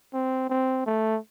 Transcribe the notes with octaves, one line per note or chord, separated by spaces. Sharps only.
C4
C4
A3